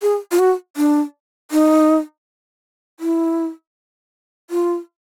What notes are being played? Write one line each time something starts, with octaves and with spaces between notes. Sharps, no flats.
G#4
F4
F#4
D4
D#4
E4
F4